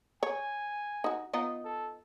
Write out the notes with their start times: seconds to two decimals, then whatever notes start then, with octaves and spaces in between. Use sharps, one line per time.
0.23 C#5 G#5
1.04 D#4 F#4
1.33 B3 D#4 F4
1.64 A4